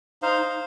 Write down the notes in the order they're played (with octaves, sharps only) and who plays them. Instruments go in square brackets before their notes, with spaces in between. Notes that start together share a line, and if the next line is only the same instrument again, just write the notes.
[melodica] D#4 C5 F5
D#4